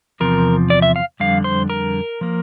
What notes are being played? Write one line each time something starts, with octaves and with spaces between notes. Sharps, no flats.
E2 C3 F3 C4 A#4
D5
E5
F5
F2 D3 G3 F5
C5
A#4
F3 A#3